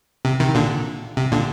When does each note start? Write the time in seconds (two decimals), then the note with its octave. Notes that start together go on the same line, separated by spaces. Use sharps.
0.25 C3
0.40 C3 D#3
0.55 A#2 D3
1.17 C3
1.32 A#2 D3